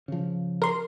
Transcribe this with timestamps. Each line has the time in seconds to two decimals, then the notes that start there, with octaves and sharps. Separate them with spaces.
0.08 C#3 F3
0.62 A#4 C6